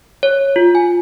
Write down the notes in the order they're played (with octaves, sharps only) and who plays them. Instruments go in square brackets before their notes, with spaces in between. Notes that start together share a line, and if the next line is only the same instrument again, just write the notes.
[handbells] C#5
F4
G#5